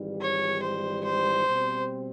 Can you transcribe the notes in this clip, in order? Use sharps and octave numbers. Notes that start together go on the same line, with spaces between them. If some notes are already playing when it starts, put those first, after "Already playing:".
Already playing: G#1 G#2 E3 G3
C#5
C5
C5
B2 G3 C4